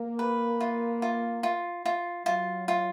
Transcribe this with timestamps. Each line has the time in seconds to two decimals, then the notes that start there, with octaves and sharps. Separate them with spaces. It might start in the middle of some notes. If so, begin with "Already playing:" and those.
Already playing: A#3
0.19 B4
0.60 F4
1.02 F4
1.43 F4
1.85 F4
2.26 F#3 F4
2.68 F4